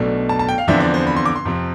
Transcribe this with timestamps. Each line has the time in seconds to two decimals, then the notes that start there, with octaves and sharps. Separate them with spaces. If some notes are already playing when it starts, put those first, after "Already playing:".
Already playing: B1 B2 A3 D4
0.29 A5
0.39 A5
0.49 G5
0.58 F5
0.68 E2 D3 F3 C4 E5
0.80 D5
0.94 C5
1.07 B5
1.16 C6
1.26 D6
1.36 C6
1.45 F2 C3 F3 C4